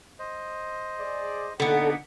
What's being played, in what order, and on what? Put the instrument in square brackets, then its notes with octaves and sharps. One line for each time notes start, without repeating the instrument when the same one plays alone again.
[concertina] C5 D#5
[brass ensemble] G#4 D5
[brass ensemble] A#2 D#4 F#5 [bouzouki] D3 B3 [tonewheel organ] A4